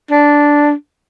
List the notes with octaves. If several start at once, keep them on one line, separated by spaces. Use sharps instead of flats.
D4